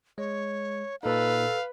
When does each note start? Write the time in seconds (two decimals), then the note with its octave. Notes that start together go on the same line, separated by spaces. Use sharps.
0.18 G#3 C#5
1.03 A#2 D#4 A4 B4 F5